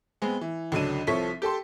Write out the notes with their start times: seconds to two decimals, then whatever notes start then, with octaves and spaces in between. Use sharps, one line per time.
0.22 G#3 B3 C4 G#4
0.41 E3
0.72 C#2 D3 F#3 D4 D#7
1.07 C2 F3 A4 C#5 C#6 B6
1.42 G4 A4 A5 C6